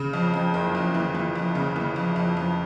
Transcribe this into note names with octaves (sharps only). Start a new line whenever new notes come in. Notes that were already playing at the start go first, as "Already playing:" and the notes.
Already playing: C#3
F2
F2
F#1
F2
E3
E3
F2
C#3
E3
F2
F2
F2